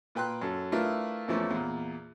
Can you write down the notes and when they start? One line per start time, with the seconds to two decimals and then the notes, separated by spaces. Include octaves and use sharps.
0.15 A#2 B4 G5 C6 F#6
0.42 F#2 A4
0.72 A3 D4 E4 F4 A#4 B4
1.28 E2 E3 F3 A3 A#3 C#4
1.51 E2 A#2